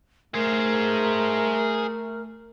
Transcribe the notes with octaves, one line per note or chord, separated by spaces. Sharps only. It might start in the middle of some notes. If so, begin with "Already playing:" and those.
A3 G#4 A#4 C5